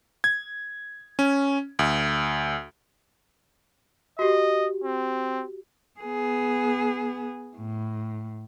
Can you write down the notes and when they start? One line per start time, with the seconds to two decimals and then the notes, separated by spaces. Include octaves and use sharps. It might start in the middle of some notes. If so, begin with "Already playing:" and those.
0.24 G#6
1.19 C#4
1.79 D2
4.19 F#4 G4 D#5
4.84 C4
6.00 B3 G#4
7.56 A2